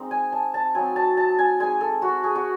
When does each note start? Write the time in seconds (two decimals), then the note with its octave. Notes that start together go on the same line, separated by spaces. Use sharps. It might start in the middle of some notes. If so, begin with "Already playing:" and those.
Already playing: G#3 C4 D#4
0.11 G#5
0.32 A5
0.54 A5
0.75 F#3 C4 D#4 G#5
0.96 A5
1.17 A5
1.39 G#5
1.60 G#3 D#4 G#5
1.81 A4
2.02 F#4
2.24 G#4
2.35 F#4